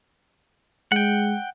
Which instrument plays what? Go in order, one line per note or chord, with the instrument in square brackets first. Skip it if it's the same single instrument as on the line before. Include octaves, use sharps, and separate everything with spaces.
[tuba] G#3 [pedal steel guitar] F#5 G5